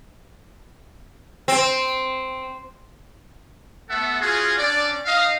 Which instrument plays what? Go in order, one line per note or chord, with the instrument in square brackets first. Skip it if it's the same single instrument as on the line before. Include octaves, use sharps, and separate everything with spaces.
[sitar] C4
[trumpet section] A3 B3 A4 E5 F#5
C#4 F4 F#4 G#4
C#4 D4 D5
D#4 D#5 F5